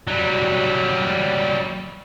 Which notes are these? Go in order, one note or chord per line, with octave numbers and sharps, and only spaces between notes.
F#3 G3